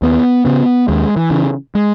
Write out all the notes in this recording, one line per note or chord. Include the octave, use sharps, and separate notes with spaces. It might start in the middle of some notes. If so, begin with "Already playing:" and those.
D#2 B3
C#3 B3
D#2 G#3
E3
C#3
G#3